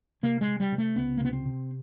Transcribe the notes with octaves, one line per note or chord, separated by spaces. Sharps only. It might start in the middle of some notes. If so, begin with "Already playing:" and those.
C3 A#3
G#3
C3
G3
C3
A3
C#2 B3
A#3
C3 B3
C4
C3